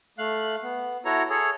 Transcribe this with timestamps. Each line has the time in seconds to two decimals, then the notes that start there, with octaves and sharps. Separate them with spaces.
0.18 A3 F5 F#6
0.63 B3
1.05 E4 F#4 A4 C#5 A#5
1.30 G#4 A4 C#5